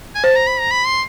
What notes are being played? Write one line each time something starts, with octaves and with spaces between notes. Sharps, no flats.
G#5
C5 A5
A#5
B5
A#5
B5
C6